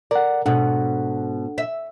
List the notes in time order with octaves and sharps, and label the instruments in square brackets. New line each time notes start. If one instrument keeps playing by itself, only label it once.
[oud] A#4 [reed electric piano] D5 F#5
[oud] G#2 B2 [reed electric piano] D4 A4 F#5
[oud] E5